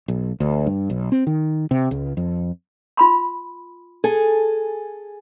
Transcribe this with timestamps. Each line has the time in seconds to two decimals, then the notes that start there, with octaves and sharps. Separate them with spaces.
0.08 B1
0.40 D2
0.66 G2
0.90 B1
1.12 C4
1.27 D#3
1.71 C3
1.91 C#2
2.17 F2
2.97 F4 B5 C6
4.04 G#4 A4 G#5